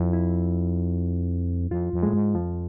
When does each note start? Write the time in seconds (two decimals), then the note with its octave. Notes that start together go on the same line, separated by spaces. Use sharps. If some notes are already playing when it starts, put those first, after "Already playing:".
Already playing: F2 E4
0.13 E4
1.71 F2 F4
1.93 F2
2.03 A2 G#3
2.14 G#2
2.35 F2 F3